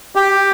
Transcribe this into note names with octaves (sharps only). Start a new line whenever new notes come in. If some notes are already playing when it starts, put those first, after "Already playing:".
G4